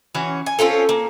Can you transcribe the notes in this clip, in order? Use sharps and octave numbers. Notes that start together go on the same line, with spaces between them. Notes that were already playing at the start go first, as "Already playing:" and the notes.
E3 C#4 F#4
G#5
C4 C#4 F4 A4
A#3